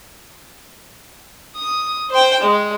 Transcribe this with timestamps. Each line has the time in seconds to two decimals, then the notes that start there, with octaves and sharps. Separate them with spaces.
1.56 D#6
2.10 C5 G5
2.40 G#3